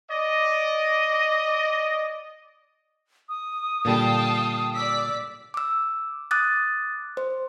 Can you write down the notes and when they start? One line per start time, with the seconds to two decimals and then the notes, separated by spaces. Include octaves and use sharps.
0.11 D5 D#5
3.29 D#6
3.85 A#2 D3 G3 F5 G5 A5
4.75 D5 E6 B6
5.54 D6 E6
6.31 D6 D#6 F#6 A6
7.17 C5